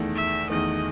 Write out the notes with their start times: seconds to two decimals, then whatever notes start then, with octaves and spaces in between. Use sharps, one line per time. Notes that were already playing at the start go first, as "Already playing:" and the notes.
Already playing: E2 D#3 A3
0.15 E5
0.50 E2 D#3 A3 D#5